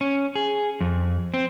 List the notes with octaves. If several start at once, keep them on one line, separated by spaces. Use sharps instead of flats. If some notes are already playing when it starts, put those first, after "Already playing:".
C#4
G#4
F2
C4